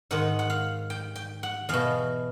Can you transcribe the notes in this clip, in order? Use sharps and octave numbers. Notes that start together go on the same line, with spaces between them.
G#2 D#3 F#5
F#5
F5
G5
G5
F#5
E2 B2 F5